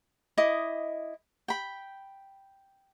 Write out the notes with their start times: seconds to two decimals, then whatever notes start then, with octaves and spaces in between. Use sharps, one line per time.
0.37 E4 D#5 D6 D#6
1.48 G5 B5